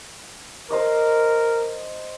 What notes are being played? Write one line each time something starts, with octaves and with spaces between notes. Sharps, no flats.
A#4 C5 D#5 D6